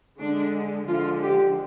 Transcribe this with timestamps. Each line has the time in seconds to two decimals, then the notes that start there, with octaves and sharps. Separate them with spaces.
0.19 D3 G#3 D4
0.87 D3 F3 G#3 F4
1.22 G4